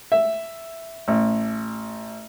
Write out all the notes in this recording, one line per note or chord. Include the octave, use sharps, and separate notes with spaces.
E5
A1